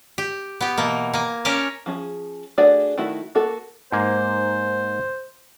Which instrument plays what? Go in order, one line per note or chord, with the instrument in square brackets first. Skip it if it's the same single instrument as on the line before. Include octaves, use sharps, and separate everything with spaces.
[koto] G4
B3 G4
B2 E3 A#3
A#3 G#5
C#4 G4 A#4 G#5 A5
[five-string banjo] F3 C#4 G#4
A3 D4 F#4 G#4 D5
D#3 A3 E4 F#4
A#3 F#4 A4
[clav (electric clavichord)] G#2 A#3 [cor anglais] C5